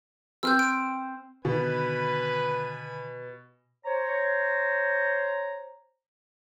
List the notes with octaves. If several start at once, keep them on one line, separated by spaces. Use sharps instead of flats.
C4 C5 E6 F6 G6
D7
B2 D3 D#3 B4 G#5 B5
C5 C#5 A#5